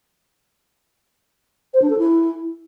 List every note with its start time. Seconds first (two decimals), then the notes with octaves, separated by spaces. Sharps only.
1.74 C5
1.82 D4
1.90 A4
1.98 E4